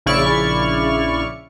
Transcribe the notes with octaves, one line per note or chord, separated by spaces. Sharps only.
A#1 C#3 E4 D5 C#6 F6